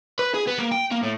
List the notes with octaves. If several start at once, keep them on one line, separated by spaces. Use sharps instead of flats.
B4
G#4
B3
A#3
G5
A#3
A2